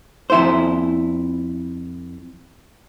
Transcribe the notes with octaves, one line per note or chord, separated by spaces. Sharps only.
F2 E4 C5